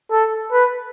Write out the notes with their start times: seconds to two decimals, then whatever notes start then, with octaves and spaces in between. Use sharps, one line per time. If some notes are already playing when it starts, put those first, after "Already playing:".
0.11 A4
0.52 B4